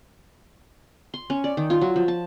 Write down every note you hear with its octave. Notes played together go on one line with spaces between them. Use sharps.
C6
C#4
D5
D#3
F4
F#3
F3
A5